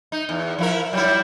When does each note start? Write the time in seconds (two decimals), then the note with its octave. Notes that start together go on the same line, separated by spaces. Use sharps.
0.12 D#4
0.29 E2
0.58 F3 E4 A#4
0.93 F#3 G3 E4